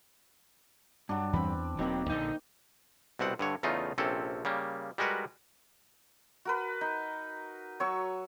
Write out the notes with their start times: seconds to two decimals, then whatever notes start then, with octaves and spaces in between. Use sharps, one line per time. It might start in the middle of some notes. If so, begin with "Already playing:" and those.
1.09 G2 F#3 D4
1.33 E2 E3 C4 B5
1.79 E1 D#3 F#3 A#3 C4
2.10 A#1 D3 D#4
3.19 C2 B2 C4 F#5
3.39 G2 D3 C#5
3.63 E2 C#3 A3 D#4 F4
3.98 A#1 C3 C4 C#4 A4
4.45 C#3 G3 A#3
4.98 G3 G#3 F#4 A#4 B4 F#5
6.45 F#4 A#4 B4
6.81 D#4
7.80 F#3 C#5 C#6 E6